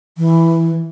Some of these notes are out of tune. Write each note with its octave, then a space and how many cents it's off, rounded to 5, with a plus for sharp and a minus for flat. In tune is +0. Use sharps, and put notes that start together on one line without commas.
E3 +0